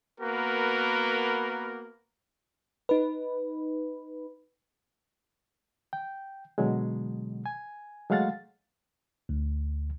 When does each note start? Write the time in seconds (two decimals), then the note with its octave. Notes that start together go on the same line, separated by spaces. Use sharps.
0.20 A#3 B3 F#4 A#4 B4
2.89 D#4 B4
5.93 G5
6.58 B2 D3 F#3 G#3
7.46 G#5
8.10 F#3 G#3 A3 F5 F#5 A6
9.29 D2